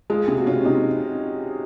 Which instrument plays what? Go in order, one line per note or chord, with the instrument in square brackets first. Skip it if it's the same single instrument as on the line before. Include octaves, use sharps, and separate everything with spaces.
[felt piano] G#3 [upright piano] F4 G#4
[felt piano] C3 [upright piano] F4 G#4
[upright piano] F#4
[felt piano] C3 [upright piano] C#4 F4
[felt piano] C3 [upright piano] D#4